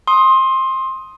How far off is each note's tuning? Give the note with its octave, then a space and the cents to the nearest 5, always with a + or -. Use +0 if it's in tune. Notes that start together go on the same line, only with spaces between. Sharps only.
C6 +20 D#6 +10